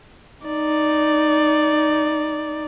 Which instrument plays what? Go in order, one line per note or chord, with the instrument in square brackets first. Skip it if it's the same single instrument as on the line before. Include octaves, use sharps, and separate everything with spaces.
[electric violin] D#4 D5